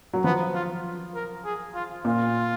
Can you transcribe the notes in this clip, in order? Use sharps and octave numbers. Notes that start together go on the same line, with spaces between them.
F#3
F3 B3
F4
A#4
G#4
F4
A#2 F4